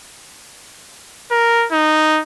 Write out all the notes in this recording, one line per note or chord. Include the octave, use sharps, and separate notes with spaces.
A#4
D#4